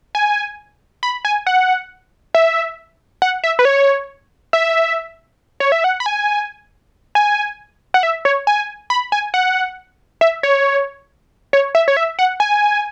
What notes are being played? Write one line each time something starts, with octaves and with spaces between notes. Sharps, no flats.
G#5
B5
G#5
F#5
E5
F#5
E5
B4
C#5
E5
C#5
E5
F#5
B5
G#5
G#5
F#5
E5
C#5
G#5
B5
G#5
F#5
E5
C#5
C#5
E5
C#5
E5
F#5
G#5